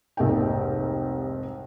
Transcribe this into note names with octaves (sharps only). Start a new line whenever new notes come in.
F1 C2 G#2 A#3 G5